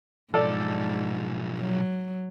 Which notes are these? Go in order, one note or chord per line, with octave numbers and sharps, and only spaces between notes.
B1 G#2 F3 A4 D5
F#3